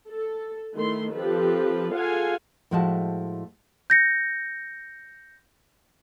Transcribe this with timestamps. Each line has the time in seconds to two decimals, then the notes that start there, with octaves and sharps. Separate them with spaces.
0.10 A4
0.76 D#3 A3 E4 C6
1.13 F3 C4 G4 A4 B4
1.92 F4 G#4 A4 F5 F#5 G#5
2.71 A2 F3 G#3 F#4 D#5 A5
3.90 G6 A#6 C#7